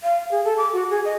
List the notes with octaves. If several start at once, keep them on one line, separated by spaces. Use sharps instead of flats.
F5
G#4
A4
D6
F#4
G#4
D#5